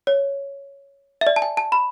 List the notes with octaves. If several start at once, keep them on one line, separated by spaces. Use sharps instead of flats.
C#5
E5
D5
A5
G#5
A5
B5